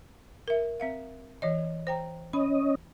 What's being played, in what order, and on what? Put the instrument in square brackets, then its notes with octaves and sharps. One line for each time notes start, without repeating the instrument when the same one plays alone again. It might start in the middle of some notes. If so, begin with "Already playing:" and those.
[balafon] A#4 E5
C4 E5 F5
E3 C#5 D#5
C5 G5 A#5
[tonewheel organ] C#4 D#5 [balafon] B5